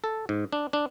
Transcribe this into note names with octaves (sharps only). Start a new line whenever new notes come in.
A4
G#2
D4
D4